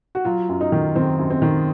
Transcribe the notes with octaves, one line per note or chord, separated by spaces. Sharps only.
F#4
F#3 F4
F#2
D#4
D#3
D#3 C4
F#2
C4
D#3